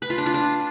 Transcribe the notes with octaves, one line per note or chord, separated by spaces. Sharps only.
B4
F4
D4
F4
D4